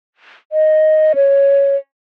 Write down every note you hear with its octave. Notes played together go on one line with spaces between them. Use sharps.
D#5
C#5